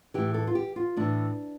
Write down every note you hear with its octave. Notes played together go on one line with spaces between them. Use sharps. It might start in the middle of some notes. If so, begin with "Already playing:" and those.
A2 E3 G4
A4
F4
G4
F4
A2 E3 D4